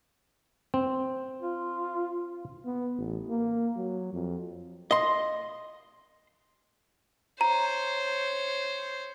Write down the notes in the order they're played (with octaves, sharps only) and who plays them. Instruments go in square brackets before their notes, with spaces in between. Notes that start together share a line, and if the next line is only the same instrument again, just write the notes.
[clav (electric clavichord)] C4
[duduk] F4
[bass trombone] B3
A1
A#3
F#3
F2
[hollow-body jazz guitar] D#5 C6
[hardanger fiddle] C5 C#5 [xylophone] A#5